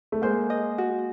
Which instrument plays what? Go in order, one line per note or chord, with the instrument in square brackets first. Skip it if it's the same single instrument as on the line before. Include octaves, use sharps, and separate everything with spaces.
[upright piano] A3
[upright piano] G#3 A#3 [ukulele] C5
[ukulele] D#5
F#4